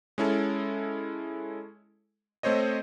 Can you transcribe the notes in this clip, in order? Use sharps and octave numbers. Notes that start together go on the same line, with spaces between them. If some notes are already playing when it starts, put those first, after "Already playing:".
G#3 C#4 E4 A4
A3 C4 C5 C#5 D#5